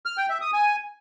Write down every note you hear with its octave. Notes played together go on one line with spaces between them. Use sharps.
F6
G5
E5
D#6
G#5